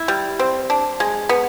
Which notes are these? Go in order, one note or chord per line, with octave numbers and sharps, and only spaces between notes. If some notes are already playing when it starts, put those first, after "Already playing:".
Already playing: E4
G3
C4
D4
G#3
B3